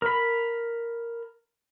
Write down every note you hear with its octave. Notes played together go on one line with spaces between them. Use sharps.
A#4 B5